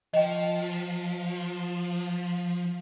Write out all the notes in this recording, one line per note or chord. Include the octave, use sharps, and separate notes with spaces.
F3 D#5 G5